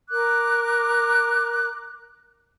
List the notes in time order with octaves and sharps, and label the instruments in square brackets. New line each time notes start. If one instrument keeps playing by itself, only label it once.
[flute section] A#4 D6 F#6